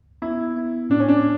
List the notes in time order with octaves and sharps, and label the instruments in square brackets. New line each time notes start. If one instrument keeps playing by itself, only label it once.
[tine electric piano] B3 [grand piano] E4
[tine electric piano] B3
[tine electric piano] A2 [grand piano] D4
[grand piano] C#4
D4